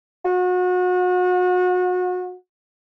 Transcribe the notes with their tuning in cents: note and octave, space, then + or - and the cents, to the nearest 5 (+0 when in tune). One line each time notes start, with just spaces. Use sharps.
F#4 -30